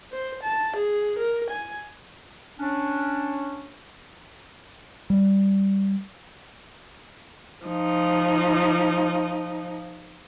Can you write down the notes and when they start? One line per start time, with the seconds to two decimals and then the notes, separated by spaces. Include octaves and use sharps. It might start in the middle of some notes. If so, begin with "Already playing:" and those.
0.12 C5
0.43 A5
0.76 G#4
1.19 A#4
1.50 G#5
2.59 C#4 D4
5.10 G3
7.66 F3 D#4